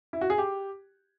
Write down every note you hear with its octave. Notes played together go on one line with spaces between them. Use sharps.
E4
F#4
G#4
G4